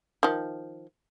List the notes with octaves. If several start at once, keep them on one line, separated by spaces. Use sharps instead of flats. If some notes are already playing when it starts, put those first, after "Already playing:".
D#3 F3